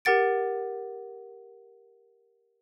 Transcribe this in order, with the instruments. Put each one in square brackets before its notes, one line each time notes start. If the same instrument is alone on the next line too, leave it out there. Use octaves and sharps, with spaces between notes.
[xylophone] G4 A#4 F#5 A6 D7